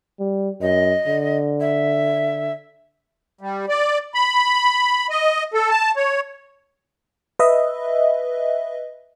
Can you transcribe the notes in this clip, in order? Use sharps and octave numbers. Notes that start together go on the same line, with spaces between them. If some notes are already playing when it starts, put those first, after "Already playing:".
G3
F#2 D#5
D3
E5
G3
D5
B5
D#5
A4
A5
C#5
B4 D#5 E5